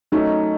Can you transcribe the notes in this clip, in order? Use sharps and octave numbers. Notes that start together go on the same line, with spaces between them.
F#3 A3 C#4 D#4